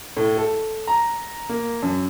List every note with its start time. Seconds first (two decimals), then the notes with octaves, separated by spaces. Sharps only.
0.17 A2
0.38 A4
0.87 A#5
1.49 A#3
1.82 F#2